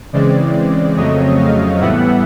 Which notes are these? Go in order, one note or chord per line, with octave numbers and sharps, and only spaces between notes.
C#3 E3 G#3 C4 D5
F2 C#3 F#3 A3 C4 C#5 D#5
D#5 F5
A2 E3 G3 B3 E5 F#5